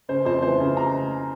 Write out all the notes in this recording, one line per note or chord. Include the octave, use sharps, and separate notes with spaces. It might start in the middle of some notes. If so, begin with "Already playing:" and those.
C#3 C5
F2 C5
E3 C5
C#3
A#5